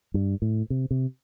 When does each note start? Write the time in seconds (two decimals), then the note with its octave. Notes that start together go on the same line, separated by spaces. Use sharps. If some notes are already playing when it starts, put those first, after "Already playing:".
0.14 G2
0.42 A2
0.70 C3
0.91 C3